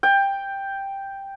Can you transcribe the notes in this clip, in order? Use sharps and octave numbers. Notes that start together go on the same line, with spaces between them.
G5